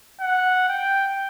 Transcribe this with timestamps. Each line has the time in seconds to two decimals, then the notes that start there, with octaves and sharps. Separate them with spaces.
0.20 F#5
0.69 G5